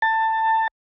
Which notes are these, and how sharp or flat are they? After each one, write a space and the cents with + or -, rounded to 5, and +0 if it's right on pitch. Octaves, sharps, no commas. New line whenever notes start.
A5 +20